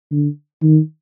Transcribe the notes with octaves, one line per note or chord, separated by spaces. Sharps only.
D3
D#3